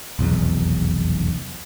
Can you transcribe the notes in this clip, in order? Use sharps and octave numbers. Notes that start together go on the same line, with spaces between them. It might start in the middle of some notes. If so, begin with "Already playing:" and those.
F1 B1 E2